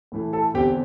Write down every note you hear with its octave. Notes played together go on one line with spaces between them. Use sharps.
A2 E3 A3
A4 A5
E2 D3 C4 G4 G5